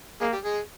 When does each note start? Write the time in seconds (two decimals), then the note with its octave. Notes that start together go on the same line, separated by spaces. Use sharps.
0.21 G#3 A#3 G#4
0.33 G3 G4
0.44 G#3 G#4